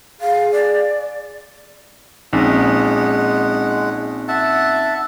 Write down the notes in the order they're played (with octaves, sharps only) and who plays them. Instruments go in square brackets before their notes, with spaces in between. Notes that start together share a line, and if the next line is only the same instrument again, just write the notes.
[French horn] G#4 [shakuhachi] F5
[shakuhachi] D5
[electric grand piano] A#1 [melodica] G#3 F#5 [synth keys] C4 C#4 D#4
[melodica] E5 F#5 A5